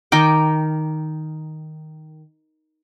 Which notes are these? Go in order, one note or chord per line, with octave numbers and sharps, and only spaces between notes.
D#3 A#4 G5 D6